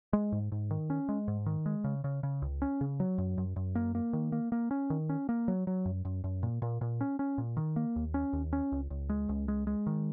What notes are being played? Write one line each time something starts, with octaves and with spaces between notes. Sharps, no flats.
G#3
G#2
G#2
D#3
C#4
G#3
G#2
D#3
G#3
C#3
C#3
C#3
C#2
C#4
C#3
F#3
F#2
F#2
F#2
A#3
A#3
D#3
A#3
A#3
C#4
D#3
C#4
A#3
F#3
F#3
F#2
F#2
F#2
A#2
A#2
A#2
C#4
C#4
A#2
D#3
A#3
D#2
C#4
D#2
C#4
C#2
C#2
G#3
C#2
G#3
G#3
D#3